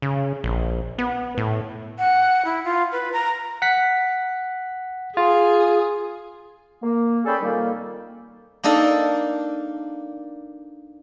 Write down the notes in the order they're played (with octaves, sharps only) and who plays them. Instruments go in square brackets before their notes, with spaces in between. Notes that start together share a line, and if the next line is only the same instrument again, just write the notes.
[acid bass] C#3
A#1
B3
A2
[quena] F#5
E4
F4
B4
A#5
[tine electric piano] F#5 B6
[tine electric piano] F4 [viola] G#4
[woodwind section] A#3
C#4 G#4 A4 D5 G5 B5
F2 D#3 G3 A#3
[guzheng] A#3 D4 D#4 A4 A#4